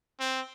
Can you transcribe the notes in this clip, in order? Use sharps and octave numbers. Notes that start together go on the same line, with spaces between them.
C4